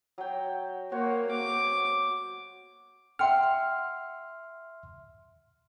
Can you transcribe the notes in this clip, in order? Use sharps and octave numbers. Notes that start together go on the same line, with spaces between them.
F#3 G5
A#3 F#4 C5 C#5
D6
E5 F#5 G5 C6 F6